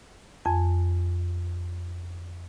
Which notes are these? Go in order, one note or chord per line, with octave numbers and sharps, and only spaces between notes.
F2 G#5